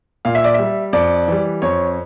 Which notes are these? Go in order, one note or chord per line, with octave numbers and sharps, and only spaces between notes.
A#2 F5
E5
D5
G3 E5
F2 D5
E3 G3
F2 C#5